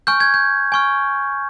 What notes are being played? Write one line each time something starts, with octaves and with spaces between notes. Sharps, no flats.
G#5 C#6 F6 G6
G#6
G6
G#5 C#6 F6